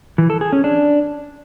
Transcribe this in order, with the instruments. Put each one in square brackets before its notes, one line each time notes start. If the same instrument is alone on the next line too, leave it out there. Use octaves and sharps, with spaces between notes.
[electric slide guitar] E3
A4
G#4
C#4
D4